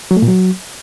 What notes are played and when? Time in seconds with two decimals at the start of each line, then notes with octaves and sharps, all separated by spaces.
0.11 F#3
0.17 A3
0.22 A#2
0.28 F#3